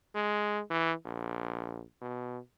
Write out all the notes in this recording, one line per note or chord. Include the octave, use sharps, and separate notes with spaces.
G#3
E3
A#1
B2